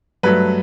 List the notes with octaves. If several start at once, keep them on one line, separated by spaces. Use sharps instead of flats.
G2 F#3 A3 B4